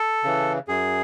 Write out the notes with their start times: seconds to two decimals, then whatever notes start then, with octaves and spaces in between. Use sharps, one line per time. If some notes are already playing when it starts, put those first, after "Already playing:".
Already playing: A4
0.24 C#3 E3
0.68 F#2 G#4